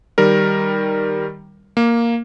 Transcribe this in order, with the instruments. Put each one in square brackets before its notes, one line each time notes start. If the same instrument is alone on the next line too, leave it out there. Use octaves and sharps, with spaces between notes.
[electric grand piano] D#3 G3 A#4
A#3